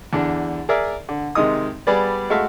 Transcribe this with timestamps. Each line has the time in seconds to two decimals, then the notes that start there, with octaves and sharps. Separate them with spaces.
0.13 E2 D3 D4
0.69 G#4 A#4 D5 E5
1.09 D3
1.35 C3 D#3 G#3 D#4 D#6
1.87 G3 B3 G#4 B4 D5
2.30 G#3 A3 F#4 E5 F5